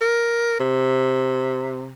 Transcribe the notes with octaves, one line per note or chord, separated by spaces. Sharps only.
A#4
C3